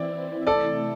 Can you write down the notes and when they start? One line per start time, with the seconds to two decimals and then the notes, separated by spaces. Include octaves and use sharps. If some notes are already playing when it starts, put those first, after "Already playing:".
Already playing: E3 C4 E4 D5
0.47 C3 A3 E4 A4 D5